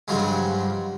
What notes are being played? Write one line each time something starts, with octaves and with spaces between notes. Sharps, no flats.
G2 C#3 F3 F#3 G#3